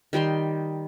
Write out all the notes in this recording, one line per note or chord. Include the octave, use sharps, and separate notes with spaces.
D#3 G3 G5 C6